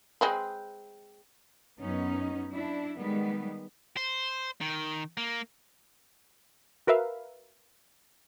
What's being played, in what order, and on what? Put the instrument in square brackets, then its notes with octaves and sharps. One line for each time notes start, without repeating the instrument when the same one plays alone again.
[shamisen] G#3 C4 B4
[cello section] F#2 B3 C#4 D#4
D4 E4
D#3 G3 G#3 B3
[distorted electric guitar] C5
D#3
A#3
[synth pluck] F#4 A#4 B4 E5 F5